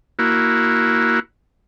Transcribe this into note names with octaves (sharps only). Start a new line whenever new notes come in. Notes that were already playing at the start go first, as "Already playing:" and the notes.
A#3 E4 F#4